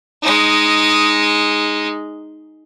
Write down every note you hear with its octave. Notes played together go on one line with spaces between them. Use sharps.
G#3 D#4